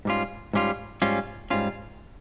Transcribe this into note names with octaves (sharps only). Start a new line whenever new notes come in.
G#2 G3 C#4 F4
G#2 G3 C#4 F4
G#2 G3 C#4 F4
G#2 G3 C#4 F4